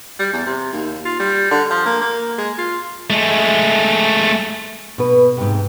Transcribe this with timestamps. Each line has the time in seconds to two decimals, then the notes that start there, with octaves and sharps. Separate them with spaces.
0.19 G3
0.33 E2
0.46 C3
0.73 D#2
1.05 F4
1.20 G3
1.51 D3
1.70 F3
1.86 A#3
2.01 A#3
2.38 G#3
2.58 F4
3.10 G#3 A3
4.98 B2 B4
5.37 G#2 C3